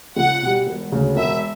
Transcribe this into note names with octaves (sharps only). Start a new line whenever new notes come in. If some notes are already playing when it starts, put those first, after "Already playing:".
C#2 F#5
B2 G3
E1
D2 C#3
E1 E5